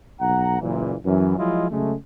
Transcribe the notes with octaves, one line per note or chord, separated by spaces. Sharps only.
B1 F#5 A#5
F#1 A#2 E3
F#2 E3
F3 F#3 G#3 E4 F4 D#5
C#3 F#3 G#3 A3